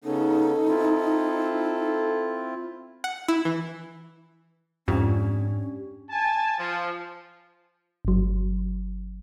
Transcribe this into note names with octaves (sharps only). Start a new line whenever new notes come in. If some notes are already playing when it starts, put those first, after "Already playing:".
C#3 B3 C#4 D#4 A4
C4 E4 F4
F#5
E4
E3
F2 G#2 C#4 D4 G4
G#5 A5
F3
G1 F#3